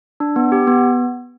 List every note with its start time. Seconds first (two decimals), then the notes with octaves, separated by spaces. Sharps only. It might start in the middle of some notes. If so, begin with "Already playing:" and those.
0.20 D4
0.36 B3
0.52 G4
0.67 B3